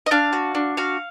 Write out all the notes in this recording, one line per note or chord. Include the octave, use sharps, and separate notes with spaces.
D#5
D4 F5
F#4
D4
F#4 F5